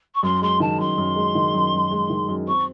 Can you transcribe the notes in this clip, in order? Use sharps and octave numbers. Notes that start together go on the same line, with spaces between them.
C#6
F#2 C6
G#3 C6
D#3 A5
F#2 C6
F#2
G#3
D#3
F#2
F#2
G#3
D#3
F#2
C4 C#6